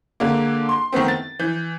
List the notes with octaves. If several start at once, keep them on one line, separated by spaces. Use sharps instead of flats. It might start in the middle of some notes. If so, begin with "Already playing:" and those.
D3 G#3 A#3
C6
D#3 A3 B3 C4
A6
E3 G6